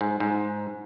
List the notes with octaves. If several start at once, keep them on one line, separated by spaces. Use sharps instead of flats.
G#2
G#2